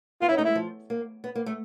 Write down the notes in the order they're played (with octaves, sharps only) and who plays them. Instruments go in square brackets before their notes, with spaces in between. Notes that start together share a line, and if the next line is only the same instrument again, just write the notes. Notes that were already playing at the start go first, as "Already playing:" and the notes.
[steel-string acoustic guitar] B3 [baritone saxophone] F4
[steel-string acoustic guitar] C#4 [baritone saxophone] E4
[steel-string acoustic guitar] A3 [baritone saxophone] D#4
[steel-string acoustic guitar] G#3 [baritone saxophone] E4
[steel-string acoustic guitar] F3
A#3
B3
A#3
A3